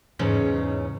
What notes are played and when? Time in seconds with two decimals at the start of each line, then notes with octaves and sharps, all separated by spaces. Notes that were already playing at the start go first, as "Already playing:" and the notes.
0.19 E2 G#2 C#3 C#4 D#4